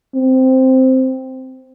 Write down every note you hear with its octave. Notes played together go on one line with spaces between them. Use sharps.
C4